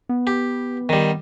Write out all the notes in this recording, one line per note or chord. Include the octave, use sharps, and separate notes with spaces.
B3
G4
D#3 G3